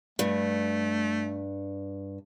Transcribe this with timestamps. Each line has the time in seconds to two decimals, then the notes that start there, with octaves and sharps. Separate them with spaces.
0.19 G2 A3